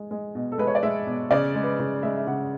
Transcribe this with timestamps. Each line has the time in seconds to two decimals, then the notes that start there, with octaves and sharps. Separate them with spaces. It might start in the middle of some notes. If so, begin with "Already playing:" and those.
Already playing: G#3
0.11 G#3
0.35 B2
0.52 A4
0.58 G#3 B4
0.67 C#5
0.75 D5
0.83 G#3 E5
1.07 B2
1.31 C#3 D5
1.55 G#3
1.63 B4
1.79 C#3
2.03 G#3 E5
2.17 E5
2.27 C#3 F#5